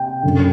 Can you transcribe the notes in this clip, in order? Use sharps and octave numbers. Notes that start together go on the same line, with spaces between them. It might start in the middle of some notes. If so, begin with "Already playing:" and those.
Already playing: C3 G5
F#2 D3